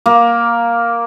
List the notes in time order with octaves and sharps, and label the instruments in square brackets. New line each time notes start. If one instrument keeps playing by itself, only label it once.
[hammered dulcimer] A#3